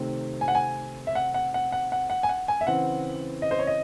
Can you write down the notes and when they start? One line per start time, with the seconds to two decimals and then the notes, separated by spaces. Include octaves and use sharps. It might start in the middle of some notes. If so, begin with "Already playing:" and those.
Already playing: C3 D#3 A3 C4
0.41 G#5
0.48 F#5
0.55 G#5
1.07 E5
1.15 F#5
1.34 F#5
1.54 F#5
1.72 F#5
1.92 F#5
2.10 F#5
2.23 G#5
2.29 F#5
2.48 G#5
2.61 E5
2.66 C#3 E3 C4 F#5
3.42 D#5
3.51 C5
3.59 C#5
3.67 D#5